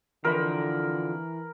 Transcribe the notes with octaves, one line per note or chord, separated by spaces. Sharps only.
F2 D3 E3 F3 A#4 B5